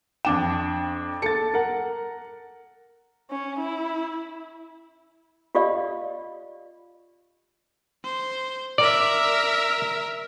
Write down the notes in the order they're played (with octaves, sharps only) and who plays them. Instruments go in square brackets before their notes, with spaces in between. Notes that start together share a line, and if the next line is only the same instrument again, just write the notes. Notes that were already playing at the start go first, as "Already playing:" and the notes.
[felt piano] F2 D4 E7 [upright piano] G5
[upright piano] A4 A6 [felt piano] C#7
[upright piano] A#4 F#5
[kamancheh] C#4
E4
[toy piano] F4 G4 D5 D#5 F5
[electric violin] C5
[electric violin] A#4 E5 [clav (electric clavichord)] D5